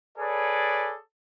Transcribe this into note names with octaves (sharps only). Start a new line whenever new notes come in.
G#4 A4 B4 C#5 D5